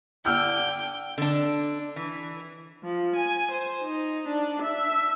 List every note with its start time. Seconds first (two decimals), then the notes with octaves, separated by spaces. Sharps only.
0.25 D3 G5 E6 F6 G6
1.18 D3 D4
1.96 E3
2.83 F3
3.16 G#5
3.51 C5
3.83 D#4
4.28 D4
4.62 E5